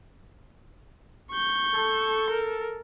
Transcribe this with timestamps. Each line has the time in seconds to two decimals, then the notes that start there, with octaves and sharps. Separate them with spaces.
1.32 C#6 G6
1.73 A4
2.31 A#4